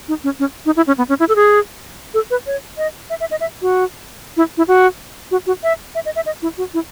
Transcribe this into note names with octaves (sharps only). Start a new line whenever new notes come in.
D#4
C#4
C#4
D#4
E4
C#4
B3
C#4
E4
A4
G#4
A4
B4
C#5
D#5
E5
E5
D#5
E5
F#4
E4
E4
F#4
F#4
F#4
E5
E5
D#5
E5
D#5
E4
F#4
E4